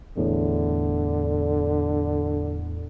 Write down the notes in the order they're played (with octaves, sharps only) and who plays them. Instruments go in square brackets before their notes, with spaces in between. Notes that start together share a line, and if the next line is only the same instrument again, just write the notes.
[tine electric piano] E2 A2 [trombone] D3